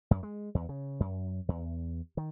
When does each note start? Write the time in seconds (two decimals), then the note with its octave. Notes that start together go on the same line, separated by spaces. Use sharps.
0.11 F#2
0.23 G#3
0.55 E2
0.69 C#3
1.00 F#2
1.49 E2
2.17 D#3